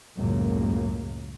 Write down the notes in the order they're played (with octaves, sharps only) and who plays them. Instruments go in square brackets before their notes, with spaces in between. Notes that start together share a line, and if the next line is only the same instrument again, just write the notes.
[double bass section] C#2 F#2 A2 C#3 A#3